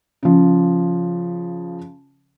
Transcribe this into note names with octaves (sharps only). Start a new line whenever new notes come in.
C#3 F3